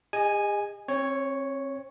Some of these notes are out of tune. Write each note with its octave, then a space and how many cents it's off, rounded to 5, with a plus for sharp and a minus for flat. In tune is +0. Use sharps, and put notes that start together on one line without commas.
G#4 -45 D#5 -10 G#5 +0
C4 +35 C#5 +0